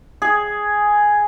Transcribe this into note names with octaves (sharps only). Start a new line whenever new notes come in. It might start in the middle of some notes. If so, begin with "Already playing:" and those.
G#4